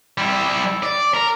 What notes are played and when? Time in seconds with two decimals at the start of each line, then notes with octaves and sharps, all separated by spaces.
0.18 G3 E4
0.83 D5
1.14 A#4